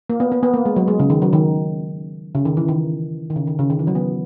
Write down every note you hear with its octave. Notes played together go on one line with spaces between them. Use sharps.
A#3
B3
B3
B3
A#3
G#3
F#3
G#3
C#3
D#3
F#3
D#3
C#3
D#3
E3
D#3
D#3
C#3
D#3
C#3
D#3
E3
F#3
B3